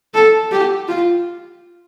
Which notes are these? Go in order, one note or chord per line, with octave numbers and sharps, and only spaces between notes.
A4
G4
F4